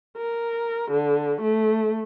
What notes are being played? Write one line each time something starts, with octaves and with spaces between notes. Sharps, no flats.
A#4
D3
A3